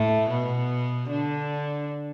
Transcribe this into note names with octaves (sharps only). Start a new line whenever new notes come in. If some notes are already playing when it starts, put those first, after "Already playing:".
Already playing: A2 A3
B2 B3
D3 D4